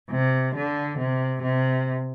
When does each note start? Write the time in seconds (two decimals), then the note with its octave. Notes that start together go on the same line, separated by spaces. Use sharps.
0.10 C3
0.54 D3
0.98 C3
1.43 C3